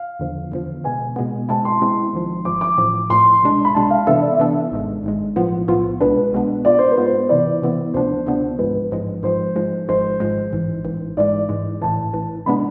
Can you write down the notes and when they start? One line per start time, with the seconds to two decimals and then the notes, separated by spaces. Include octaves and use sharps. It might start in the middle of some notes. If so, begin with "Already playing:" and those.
Already playing: F5
0.20 E2 D3 F3
0.52 E2 D3 F3
0.84 B2 G#3 B3 G#5
1.16 B2 G#3 B3
1.49 B2 G#3 C4 E4 A5
1.65 C6
1.81 B2 G#3 C4 E4
2.14 G#1 G#2 F3
2.45 G#1 G#2 F3 D6
2.61 D6
2.78 A1 A2 F3
3.10 A1 A2 F3 C6
3.42 C2 B2 G#3 D4
3.65 B5
3.74 C2 B2 G#3 D4 A5
3.90 F5
4.07 C3 E3 B3 D4 A4 E5
4.21 D5
4.34 E5
4.39 C3 E3 B3 D4 A4
4.72 G#1 G#2 G#3
5.03 G#1 G#2 G#3
5.36 B1 A2 F3 B3 F4
5.68 B1 A2 F3 B3 F4
6.01 C2 B2 G#3 B3 D4 B4
6.33 C2 B2 G#3 B3 D4
6.65 G#2 G#3 B3 F4 D5
6.79 C5
6.91 B4
6.97 G#2 G#3 B3 F4
7.06 C5
7.29 C3 E3 B3 E4 D5
7.62 C3 E3 B3 E4
7.94 D2 C3 F3 B3 D4 C5
8.27 D2 C3 F3 B3 D4
8.58 A1 G#2 F3 G#3 B4
8.91 A1 G#2 F3 G#3
9.23 G#2 F3 G#3 C5
9.56 G#2 F3 G#3
9.88 G#1 G#2 F3 G#3 C5
10.20 G#1 G#2 F3 G#3
10.53 A1 G#2 E3
10.85 A1 G#2 E3
11.17 G#2 E3 G#3 D5
11.49 G#2 E3 G#3
11.82 A1 A2 E3 A5
12.14 A1 A2 E3
12.46 C3 G#3 B3 D4 B5